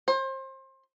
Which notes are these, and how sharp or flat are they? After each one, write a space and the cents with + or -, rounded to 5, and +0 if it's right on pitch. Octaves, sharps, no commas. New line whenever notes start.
C5 +30